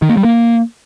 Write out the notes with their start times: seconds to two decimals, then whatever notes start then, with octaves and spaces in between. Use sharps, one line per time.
0.02 D#3
0.10 A#3
0.17 G3
0.24 A#3